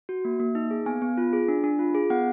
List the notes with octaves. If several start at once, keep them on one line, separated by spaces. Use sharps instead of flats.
F#4
A#3
A#3
D#4
G#4
B3 G#5
B3
F4
G#4
D4
D4
F4
G#4
B3 F#5